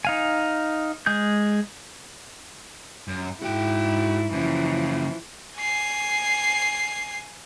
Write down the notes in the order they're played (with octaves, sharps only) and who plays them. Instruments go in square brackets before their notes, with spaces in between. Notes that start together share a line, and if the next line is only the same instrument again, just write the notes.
[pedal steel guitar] D#4 F5 G#5
G#3 G#4 G6
[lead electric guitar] F#2
[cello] G#2 E4 [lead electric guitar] F#4 G5
[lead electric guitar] F#2 C#3 [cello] E3 F3
[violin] G#5 C7